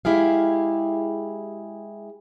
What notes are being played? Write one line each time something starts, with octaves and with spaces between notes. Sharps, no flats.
G#3 E4 G4 G#4 F5